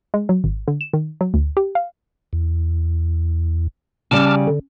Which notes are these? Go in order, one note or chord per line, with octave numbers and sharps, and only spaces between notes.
G#3
F#3
G#1
D3
E7
D#3
F#3
D2
G4
F5
E2
C#3 G3 A5 D6 F6
D3